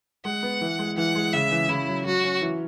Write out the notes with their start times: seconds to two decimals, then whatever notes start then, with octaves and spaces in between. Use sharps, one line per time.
0.25 G#3 F#5
0.43 B3
0.61 E3
0.79 G#3
0.97 E3 F#5
1.15 G#3
1.33 C#3 E5
1.51 E3
1.69 C#3 E4
1.88 F#3
2.06 F#3 F#4
2.24 C#4
2.42 E3